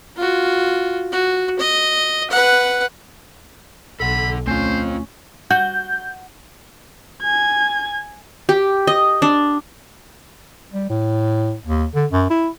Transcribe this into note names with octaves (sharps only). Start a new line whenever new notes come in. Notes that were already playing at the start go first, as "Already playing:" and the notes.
F4 F#4
F#4
D#5
B4 F#5
B1 A4 F#5 B5
D2 A3 C4 C#4 F4 C5 G#5
F#4 G6
G#5 G#6
G4
D#5
D4
G3
A2
D#2
D3
F#2
E4